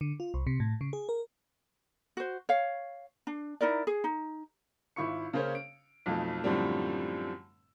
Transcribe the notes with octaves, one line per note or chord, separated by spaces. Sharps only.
D3
F4
C2
C3
A2
C#3
G#4
A#4
F#4 C5
C#5 F5
D4
D#4 E4 A#4 D5
G#4
D#4
G#1 E4 F4 C#6 C#7
C#3 A#3 C#4 C5 C#5
D7
B1 F2 F3 A3
F#2 A2 D3 F3 G3 C4